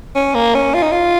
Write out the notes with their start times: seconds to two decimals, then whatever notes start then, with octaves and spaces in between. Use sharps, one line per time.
0.15 C#4
0.34 A#3
0.55 C#4
0.74 F4
0.82 D#4
0.92 F4